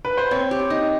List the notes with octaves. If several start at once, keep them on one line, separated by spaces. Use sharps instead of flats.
B4
C5
C4 C#5
G4
D#4